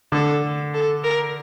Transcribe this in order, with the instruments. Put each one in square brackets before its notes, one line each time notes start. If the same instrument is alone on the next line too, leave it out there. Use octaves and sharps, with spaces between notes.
[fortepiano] D3 [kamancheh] A4
[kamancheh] A4
A#4